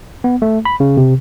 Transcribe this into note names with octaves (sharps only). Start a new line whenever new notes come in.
B3
A3
B5
C#3
C3